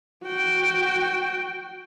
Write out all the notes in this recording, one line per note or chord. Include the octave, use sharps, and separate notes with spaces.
F#4 G5